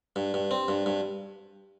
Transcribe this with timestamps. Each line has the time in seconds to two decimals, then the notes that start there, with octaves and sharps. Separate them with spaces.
0.16 G2
0.34 G2
0.51 C4
0.68 G2
0.86 G2